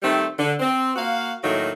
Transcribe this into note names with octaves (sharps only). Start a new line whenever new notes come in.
D#3 G3 A3 C4
D3
C4
A#3 F#4 F5
A2 D#3 F#3 A3 A#3